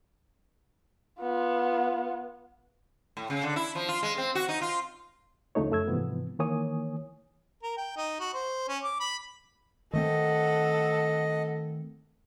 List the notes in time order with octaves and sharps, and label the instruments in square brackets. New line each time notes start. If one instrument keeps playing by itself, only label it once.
[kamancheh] B3 F4
[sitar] A2
C#3
D3
E4
F3
F4
G#3
C4
F#4
D#4
F4
[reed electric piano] D2 C#3 F3 A3 D#4 C#5
F#2 A3 E6 G#6
G#2 C3 E3 F3 B3
D#3 E3 A#3 C#5 G#5 D#6
[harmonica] A#4
G5
D#4
F#4
C5
C#4
D6
B5
[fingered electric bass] D#3 A3 C4 [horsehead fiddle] A4 F#5 [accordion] D#5